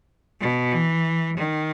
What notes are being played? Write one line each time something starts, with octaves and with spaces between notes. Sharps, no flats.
B2
E3
D#3